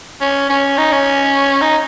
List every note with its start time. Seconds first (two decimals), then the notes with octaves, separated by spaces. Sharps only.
0.21 C#4
0.49 C#4
0.78 D#4
0.92 C#4
1.61 D#4